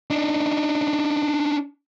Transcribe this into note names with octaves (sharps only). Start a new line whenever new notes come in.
D4 D#4